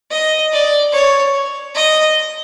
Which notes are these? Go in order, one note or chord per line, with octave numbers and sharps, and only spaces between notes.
D#5
D5
C#5
D#5